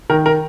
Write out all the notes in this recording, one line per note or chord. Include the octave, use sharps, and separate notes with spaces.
D#3 A#4
A#4